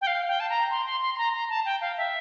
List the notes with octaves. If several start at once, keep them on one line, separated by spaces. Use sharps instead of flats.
G5
F5
G5
A5
A#5
C6
C6
C6
C6
A#5
A#5
A5
G5
F5
E5